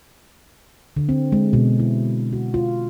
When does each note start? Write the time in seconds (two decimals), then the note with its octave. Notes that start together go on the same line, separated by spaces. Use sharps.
0.96 D3
1.09 C4
1.32 G#3
1.53 B2
1.79 E4
2.33 F#4
2.54 F4